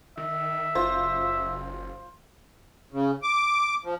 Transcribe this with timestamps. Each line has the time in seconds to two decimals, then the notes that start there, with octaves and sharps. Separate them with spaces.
0.17 D#3 E5
0.75 F#1 F4 C5
2.92 C#3
3.22 D6
3.84 F3